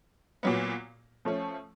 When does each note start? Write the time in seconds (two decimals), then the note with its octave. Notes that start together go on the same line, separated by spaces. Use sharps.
0.43 A#2 F#3 B3
1.25 F3 A3 C#4